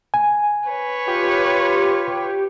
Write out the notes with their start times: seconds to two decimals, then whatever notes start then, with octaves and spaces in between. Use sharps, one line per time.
0.14 G#5
0.70 B4 C#5
1.08 F4 G4